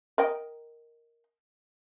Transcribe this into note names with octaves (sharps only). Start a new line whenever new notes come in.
A#4 D#5 G5